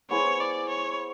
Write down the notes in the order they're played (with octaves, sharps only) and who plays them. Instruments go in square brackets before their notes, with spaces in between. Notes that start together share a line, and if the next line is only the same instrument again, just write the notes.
[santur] B3 E4 G#4 C5 [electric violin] C#5
[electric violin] D5
C#5